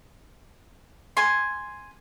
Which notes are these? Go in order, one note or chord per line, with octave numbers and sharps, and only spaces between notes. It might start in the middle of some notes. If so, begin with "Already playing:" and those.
G#5 C6